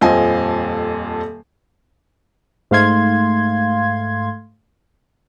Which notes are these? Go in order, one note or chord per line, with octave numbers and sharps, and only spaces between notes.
D#1 F2 C4 F4 D#5 G#5
G#2 A3 F5 C6 G#6